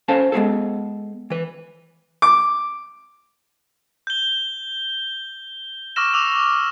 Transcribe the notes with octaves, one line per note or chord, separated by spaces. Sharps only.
C#4 A4 C5 F5 A5
G#3 B3 G#4 A4
E3 B4
D6
G6 G7
C#6 D6 E6 F6 A#6 E7
D6 E6 E7 F7